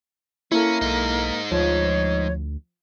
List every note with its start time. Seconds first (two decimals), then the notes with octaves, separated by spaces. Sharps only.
0.52 A#3 C#4 E4 A4
0.81 B1 G#3 D#4
1.51 D2 F3 C#5